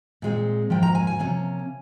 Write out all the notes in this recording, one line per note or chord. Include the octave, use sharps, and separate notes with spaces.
A#2 G#3 C4
G#2 F3 A#3 G5
A#5
G#5
G#5
C3 F3 A#3 C#4